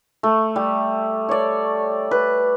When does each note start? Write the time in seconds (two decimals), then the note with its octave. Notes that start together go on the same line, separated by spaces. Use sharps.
0.23 A3
0.56 G3
1.29 C#5 D5
2.11 B4